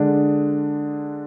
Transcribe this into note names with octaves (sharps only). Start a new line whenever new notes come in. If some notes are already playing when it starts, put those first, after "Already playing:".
Already playing: D3 G#3 D4